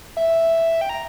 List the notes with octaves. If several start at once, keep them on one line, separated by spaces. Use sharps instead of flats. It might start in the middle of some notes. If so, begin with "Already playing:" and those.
E5
G5
A#5